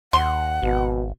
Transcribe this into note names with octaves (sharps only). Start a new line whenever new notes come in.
D#2 F#5 C6
G#1 B2